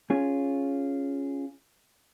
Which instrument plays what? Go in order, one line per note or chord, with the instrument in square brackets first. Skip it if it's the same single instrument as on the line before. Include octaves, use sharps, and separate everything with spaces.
[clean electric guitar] C#4 F4 G#4